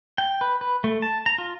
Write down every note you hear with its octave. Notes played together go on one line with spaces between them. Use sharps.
G5
B4
B4
A3
A5
A#5
F4